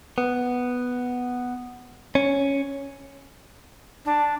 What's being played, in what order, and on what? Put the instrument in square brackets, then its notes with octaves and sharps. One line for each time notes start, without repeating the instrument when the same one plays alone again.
[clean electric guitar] B3
C#4
[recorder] D4